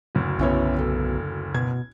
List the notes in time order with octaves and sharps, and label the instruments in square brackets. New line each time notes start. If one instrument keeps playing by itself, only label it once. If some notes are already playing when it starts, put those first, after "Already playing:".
[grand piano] F#1 D2
[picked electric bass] B1 B3 [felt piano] C#4 E4 C#5
[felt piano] A4
[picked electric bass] B2 [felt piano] G#6